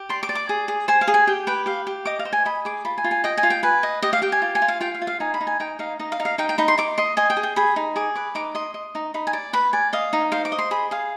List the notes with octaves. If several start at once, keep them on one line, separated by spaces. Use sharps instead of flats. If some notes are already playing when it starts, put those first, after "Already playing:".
Already playing: G4
D5 C6
D6
D5
D6
G#4
G#4
C5 G#5
F5
G#4
G#5
G4 G5
B4 G5
G4 F5
G4
D#5 D6
F5
C5
G#5
D#5 B5
G#4 D6
F4 B5
G#5
F4
G#5
D#5 G5
G#5
F4
G5
B4 G#5
D#5
G4 D#5
F5
G4 G5
G#5
F4
G#5
F4
F5
F4 G5
F5
F4
F5
D#4 G#5
B5
D#4
G#5
D#4 G5
D#4 F5
D#4 D#5
F5
D#4
F5
D#4 G5
G5
D#4 B5
C6
D#4 D6
D#5 C6
D#5 G#5
G5
G#4
G5
G#4 B5
D#4
G#4 D6
B4 D6
D#4 D6
D#5 C6
D#5
D#4
D#4 B5
G#5
D5
B4 B5
D5 G#5
D#5 F5
D#4
C5 F5
D6
D#5
C6
G#4 B5
G#4 F5